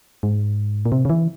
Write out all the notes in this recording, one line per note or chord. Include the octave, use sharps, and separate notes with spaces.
G#2
A#2
C3
C#3
E3